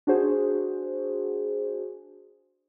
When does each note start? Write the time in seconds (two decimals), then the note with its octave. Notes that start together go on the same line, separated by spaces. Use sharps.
0.07 D4 F#4 G#4 C5